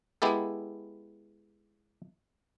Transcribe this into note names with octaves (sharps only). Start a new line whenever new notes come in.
G#3 B3 E4 G4 A4